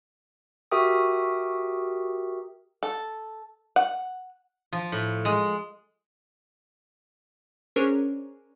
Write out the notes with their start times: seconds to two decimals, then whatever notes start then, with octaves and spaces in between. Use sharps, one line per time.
0.71 F#4 G4 A#4 E5 G5 D#6
2.83 A4
3.76 F#5
4.73 F3
4.92 A2
5.25 G#3
7.76 C#4 D4 G#4 A#4 C5 C#5